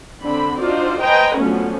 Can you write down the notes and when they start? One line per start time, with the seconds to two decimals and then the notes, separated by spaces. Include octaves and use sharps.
0.22 D3 C4 D4 B5
0.59 D4 D#4 F4 F#4 C5 D5
1.02 B4 C5 D#5 G5 G#5 A#5
1.38 D3 F3 F#3 A3 B3 C#4